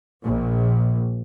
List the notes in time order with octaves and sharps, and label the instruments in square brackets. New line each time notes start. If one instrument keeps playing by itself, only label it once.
[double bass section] A#1